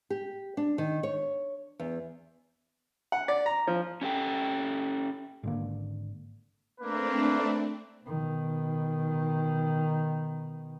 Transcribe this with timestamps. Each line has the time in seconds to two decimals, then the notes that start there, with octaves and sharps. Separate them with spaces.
0.10 G4
0.57 D4
0.78 D#3
1.03 C#5
1.80 E2
3.12 F#5
3.28 D5
3.46 A#5
3.67 F3
4.01 C#4 G4 A4 G5
5.43 G#1 D3 A#3
6.80 A3 A#3 C4 D4 B4
8.04 B2 D#3